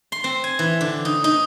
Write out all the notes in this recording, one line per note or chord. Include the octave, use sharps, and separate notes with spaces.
C6
C4
G#5
E3
D3
D#4
D#4